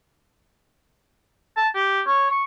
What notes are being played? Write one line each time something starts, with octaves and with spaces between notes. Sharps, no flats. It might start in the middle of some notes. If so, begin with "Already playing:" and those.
A5
G4
C#5
C#6